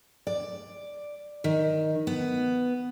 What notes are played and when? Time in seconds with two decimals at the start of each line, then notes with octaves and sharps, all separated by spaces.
0.27 D5
1.44 D#3
2.07 B3